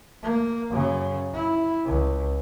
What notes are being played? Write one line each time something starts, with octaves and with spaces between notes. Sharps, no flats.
A#3
F#2 C#3
E4
C#2